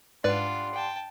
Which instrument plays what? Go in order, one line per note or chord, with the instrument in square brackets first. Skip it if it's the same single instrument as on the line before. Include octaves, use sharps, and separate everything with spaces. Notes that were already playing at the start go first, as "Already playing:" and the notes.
[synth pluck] G#2 [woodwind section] G3 F#5 C6 [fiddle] D4 F4 [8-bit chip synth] B4 D5
[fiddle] G5 A5